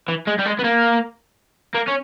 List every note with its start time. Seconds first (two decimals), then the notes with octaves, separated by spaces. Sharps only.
0.08 E3
0.27 G#3
0.38 G3
0.45 G#3
0.59 B3
0.64 A#3
1.74 A#3
1.88 C#4